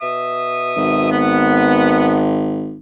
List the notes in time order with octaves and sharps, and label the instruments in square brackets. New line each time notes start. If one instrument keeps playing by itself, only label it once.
[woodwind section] B2 E5 D#6
[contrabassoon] G#1
[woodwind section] B3